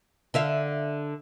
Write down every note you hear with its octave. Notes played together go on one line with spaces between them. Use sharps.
D3 E5 F5